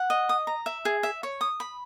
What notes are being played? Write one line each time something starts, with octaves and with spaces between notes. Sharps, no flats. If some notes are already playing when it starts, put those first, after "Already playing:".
Already playing: F#5
D#5
D#6
A#5
E5
G#4
E5
C#5
D#6
B5